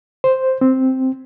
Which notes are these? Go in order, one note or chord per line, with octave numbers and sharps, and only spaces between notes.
C5
C4